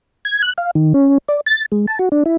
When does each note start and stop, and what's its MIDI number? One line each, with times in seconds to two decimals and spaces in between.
0.25 0.42 92
0.43 0.53 90
0.58 0.71 77
0.75 0.93 51
0.94 1.18 61
1.28 1.41 74
1.46 1.66 93
1.72 1.86 56
1.88 1.99 81
1.99 2.09 66
2.12 2.23 62
2.26 2.37 64